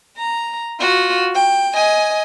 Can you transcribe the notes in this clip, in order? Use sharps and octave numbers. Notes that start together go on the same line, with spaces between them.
A#5
F4 F#4
G5
D#5 G#5